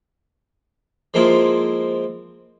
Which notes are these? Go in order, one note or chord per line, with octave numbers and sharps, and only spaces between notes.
F3 G#3 A#3 C4 E4 F4